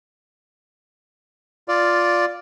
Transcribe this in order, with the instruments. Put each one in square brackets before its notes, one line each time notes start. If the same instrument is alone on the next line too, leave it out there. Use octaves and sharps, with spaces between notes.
[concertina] F4 D5